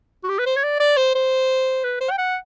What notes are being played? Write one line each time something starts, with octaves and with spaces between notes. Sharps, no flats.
F#4
G4
B4
C5
C#5
D5
D5
C5
C5
B4
C5
G5
F#5